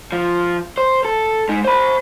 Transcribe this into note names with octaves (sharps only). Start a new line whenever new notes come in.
F3
C5
A4
G#3 D#4
C5 B5